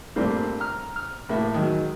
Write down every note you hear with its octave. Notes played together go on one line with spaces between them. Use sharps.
G2 A#2 A3 A#3 C4
A#5 F6
F6
A2 A#3 E5
D#3 F#3 G#3